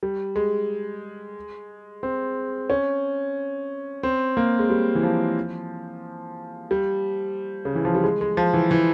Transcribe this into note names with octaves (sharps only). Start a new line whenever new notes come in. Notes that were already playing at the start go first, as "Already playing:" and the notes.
G3
G#3
C4
C#4
C4
A#3
G#3
G3
E3
F3
G3
C#3
E3
F3
G3
G#3
G#3
F3
E3
E3